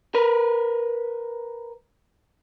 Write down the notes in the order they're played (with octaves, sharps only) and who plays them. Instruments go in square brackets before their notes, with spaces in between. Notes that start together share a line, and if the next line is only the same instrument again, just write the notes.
[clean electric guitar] A#4 B4